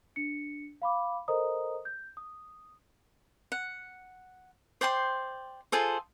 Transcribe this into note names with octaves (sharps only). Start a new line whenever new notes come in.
D4 C#7
F5 B5 D6
A4 A#4 C5 D#5 A#5 D#6
G6
D#6
F#5
C5 D5 G5 C6
F4 G#4 A4 C5